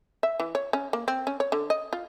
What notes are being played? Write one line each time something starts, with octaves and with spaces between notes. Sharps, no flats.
E5
E3
C#5
C#4
A#3
C4
C#4
C#5
D3
D#5
F4